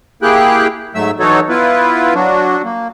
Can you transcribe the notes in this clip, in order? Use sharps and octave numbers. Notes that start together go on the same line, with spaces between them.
A#3 E4 G4 G#4 G5 F#6
G#2 F#3 A3 E5 E6
E3 F#3 D#4 F#4 A4 C#5
B3 E4 F4 B4
F#3 D4 F#4
A#3